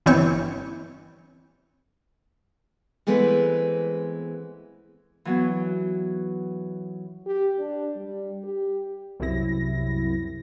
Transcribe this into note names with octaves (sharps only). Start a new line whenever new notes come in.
G1 E3 C4 C#5 C#6
E3 G#3 A3 B3 C4
E3 F#3 B3
G4
D4
G3
G4
C2 F#2 C3 E4 A#6